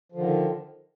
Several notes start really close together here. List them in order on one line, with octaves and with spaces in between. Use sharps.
F3 D3 D#3